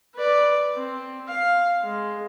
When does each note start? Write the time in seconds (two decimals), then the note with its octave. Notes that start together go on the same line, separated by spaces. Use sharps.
0.15 B4 D5
0.75 C4
1.28 F5
1.82 G#3